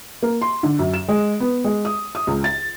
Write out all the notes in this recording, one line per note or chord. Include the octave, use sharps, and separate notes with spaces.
A#3
C6
D3
F#2
E7
G#3
B3
G#3
D#6
D#6
C#2
A6